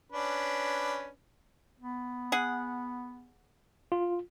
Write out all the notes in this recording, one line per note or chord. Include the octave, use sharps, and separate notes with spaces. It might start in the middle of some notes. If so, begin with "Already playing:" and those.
C#4 D4 B4
B3
G#4 F#5
F4